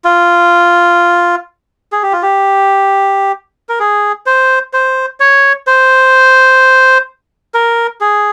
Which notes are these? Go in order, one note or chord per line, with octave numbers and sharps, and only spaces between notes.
F4
G#4
G4
F4
G4
A#4
G#4
C5
C5
C#5
C5
A#4
G#4